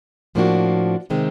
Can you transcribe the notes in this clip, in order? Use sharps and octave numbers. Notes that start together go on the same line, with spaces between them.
A2 F3 A#3 D4 F#4
C3 D#3 G#3 C4